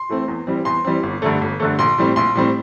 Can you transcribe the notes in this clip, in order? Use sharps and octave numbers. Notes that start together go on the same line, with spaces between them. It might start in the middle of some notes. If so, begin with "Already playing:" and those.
Already playing: C6
E3 A3 C4
E2
E3 G3 C4
E2 C6
E3 G3 C4
G1
G2 D3 A3
G1
G2 D3 A3
A#1 C6
A2 G3 C4
A#1 C6
A2 G3 C4